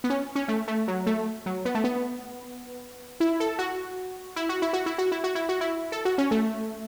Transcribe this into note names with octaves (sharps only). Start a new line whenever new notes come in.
B3
C#4
C#4
A3
A3
F#3
A3
F#3
B3
A3
B3
E4
A4
F#4
E4
F#4
E4
F#4
E4
F#4
E4
F#4
E4
F#4
E4
A4
F#4
C#4
A3